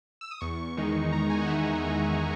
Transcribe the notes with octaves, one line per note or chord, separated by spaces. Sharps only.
E6
D#6
E2 C#6
D#3 G#3 D#4
E2 A#5
G#5
F#5
D#3 G#3 D#4 E5
F#5
E2 E5
D#4